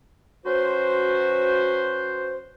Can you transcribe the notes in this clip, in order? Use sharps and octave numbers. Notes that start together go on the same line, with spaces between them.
F#3 C#4 F#4 B4 C5